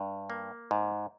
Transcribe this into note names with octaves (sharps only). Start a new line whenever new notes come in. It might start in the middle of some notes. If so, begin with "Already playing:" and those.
Already playing: G2
A#3
G#2